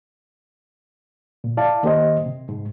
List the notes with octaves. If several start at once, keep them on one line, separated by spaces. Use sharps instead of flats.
A#2
E4 D5 F5 A5
D#3 A#3 G4 C5 D#5
C3
G#2